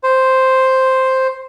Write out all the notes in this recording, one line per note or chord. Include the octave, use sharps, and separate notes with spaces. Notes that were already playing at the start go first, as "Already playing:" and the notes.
C5